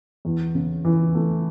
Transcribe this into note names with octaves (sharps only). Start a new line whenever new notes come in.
E2
C#3
E3
A3